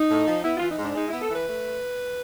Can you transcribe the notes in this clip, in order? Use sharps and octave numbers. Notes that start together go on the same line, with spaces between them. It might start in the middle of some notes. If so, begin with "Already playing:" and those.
Already playing: D#4
A2
F3
B3 E4
E3 F4
D#4
G#2 D4
G#3 D#4
B3 E4
A4
E3 B4
A3